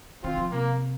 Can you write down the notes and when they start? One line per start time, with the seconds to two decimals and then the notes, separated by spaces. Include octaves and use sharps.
0.23 D#3 C4 F4
0.38 F3
0.52 C3 A#3